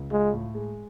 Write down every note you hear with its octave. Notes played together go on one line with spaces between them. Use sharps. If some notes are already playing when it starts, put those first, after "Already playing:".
Already playing: C#2
G#3 F4
A2
G#3